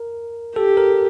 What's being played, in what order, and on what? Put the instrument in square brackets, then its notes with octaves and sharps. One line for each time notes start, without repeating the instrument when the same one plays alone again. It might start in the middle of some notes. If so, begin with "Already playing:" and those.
Already playing: [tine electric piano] A#4
[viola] G4 [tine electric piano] A4
[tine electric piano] A#4